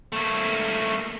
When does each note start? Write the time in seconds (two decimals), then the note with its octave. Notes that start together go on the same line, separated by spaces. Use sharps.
0.12 A3 A#3